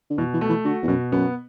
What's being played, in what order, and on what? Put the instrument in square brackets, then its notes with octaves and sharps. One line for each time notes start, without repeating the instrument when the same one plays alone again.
[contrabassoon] D3
[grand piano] B2 [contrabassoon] E3
[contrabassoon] E3
[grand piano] A3
[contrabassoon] E3
[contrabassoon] D3 [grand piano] F#4
[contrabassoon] E2
[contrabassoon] F#2 [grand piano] B2
[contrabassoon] F#2 [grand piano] B3